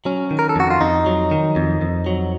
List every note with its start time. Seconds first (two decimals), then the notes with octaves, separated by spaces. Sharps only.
0.05 F#3 C#4
0.31 D#3
0.39 A#4
0.49 A4
0.56 F2 F#4
0.70 F4
0.81 F2 D#4
1.06 F#3
1.31 D#3
1.56 F2
1.81 F2
2.06 F#3